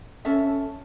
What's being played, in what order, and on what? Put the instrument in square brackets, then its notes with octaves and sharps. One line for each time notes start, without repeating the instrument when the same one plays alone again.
[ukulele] C#4 A4 E5